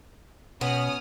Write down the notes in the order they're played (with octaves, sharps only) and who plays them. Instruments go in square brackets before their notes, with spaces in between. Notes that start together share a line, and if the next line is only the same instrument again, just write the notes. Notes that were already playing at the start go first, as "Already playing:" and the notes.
[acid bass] B2 [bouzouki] B3 [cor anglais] C#4 [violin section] D#6 F6